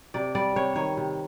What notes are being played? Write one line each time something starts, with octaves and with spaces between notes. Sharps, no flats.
C3 D5
G3 D5
C3 C#5
D#3 C#5
C3